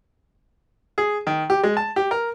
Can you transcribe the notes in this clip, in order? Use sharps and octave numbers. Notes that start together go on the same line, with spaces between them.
G#4
D#3
G4
G#3
A5
G4
A#4